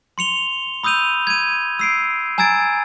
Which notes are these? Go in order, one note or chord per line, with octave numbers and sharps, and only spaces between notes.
C6 C#7 F7 G7
B5 D#6 E6 G6 D#7 F7
G#6 D#7
E6 C7 D7
G#5 A#5 E6 G#6 A6 D7